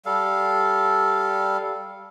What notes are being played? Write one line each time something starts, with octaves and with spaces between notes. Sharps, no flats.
G3 A4 F5